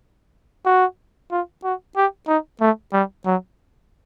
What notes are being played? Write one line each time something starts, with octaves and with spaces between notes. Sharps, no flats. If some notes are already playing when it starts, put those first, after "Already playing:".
F#4
F4
F#4
G4
D#4
A3
G3
F#3